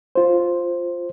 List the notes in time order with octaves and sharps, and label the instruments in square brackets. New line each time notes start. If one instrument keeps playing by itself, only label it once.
[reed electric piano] F4 C5